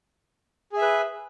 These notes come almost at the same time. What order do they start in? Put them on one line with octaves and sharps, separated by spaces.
G#4 E5 B4